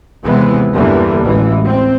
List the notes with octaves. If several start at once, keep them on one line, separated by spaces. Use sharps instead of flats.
D#2 C3 E3 G#3 B3
E2 G2 D3 E3 G3 A#3
A1 D2 E3 G#3
C4